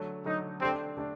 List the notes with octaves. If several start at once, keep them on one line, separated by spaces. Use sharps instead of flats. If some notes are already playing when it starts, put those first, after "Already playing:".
Already playing: D3 F#3 A3
D3 F#3 A3 D#4
D3 A3 C4 D4 G4
D3 A3 D4